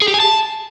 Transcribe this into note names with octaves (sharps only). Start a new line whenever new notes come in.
G#4
G4
G#5
A5